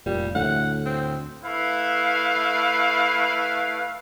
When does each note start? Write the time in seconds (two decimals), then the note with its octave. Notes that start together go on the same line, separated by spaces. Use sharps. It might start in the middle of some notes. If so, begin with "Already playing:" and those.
0.06 F1 A#2 G3
0.35 D2 A2 F#5
0.85 C4
1.44 A3 E4 B4 F5